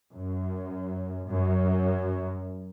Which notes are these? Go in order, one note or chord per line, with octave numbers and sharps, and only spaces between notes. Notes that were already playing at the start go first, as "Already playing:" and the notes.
F#2
F#2